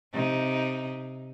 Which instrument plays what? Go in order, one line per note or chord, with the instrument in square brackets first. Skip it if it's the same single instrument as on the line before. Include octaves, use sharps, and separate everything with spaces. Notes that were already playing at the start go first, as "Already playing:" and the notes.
[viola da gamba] C3 D#4